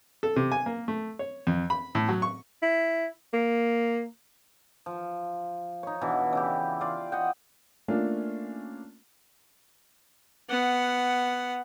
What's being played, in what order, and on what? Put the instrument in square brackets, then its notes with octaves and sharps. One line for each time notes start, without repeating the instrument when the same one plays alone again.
[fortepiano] A4
C3
G#5
A#3
A3
C#5
F2
B5
A2
F#3
C#6
[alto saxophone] E4
A#3
[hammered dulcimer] F3
D#4 C#5
B2 E3 D4
C#3 E4 G4
F4 D5
D#5 F#5 G5
[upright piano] A3 A#3 C#4 D4 F4
[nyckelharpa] B3 F#5